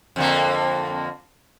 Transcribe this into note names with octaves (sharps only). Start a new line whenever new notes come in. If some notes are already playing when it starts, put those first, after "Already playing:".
F2 D3 A#3